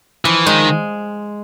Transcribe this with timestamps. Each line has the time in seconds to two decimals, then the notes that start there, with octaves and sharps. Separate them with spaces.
0.25 E3 F3
0.46 D#3 G#3